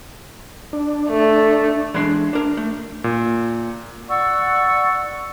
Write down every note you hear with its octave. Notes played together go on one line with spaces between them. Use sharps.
D4
A3
E3 G#3 D4 C6
D4 A#4
A3
A#2
D5 F#5 C#6 E6